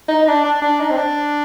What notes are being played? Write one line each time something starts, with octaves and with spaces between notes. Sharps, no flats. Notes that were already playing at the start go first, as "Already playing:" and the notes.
D#4
D#4
D4
D4
D4
D#4
C4
D4